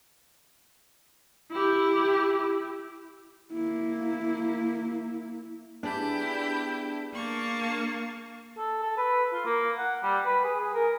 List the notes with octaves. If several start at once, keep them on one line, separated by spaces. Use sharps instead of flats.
E4 G4
A#3 E4
B3 D4 E4 G4 G#4 D5 G6
A#3 A5 C#6
A4
A4
B4
F4
A#3
F#5
G3
B4
G#4
G#4
A#4